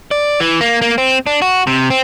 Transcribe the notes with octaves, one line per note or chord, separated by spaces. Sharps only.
D5
E3
A#3
A#3
C4
D4
F#4
C3
C4